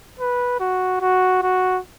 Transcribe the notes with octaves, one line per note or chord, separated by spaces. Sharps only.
B4
F#4
F#4
F#4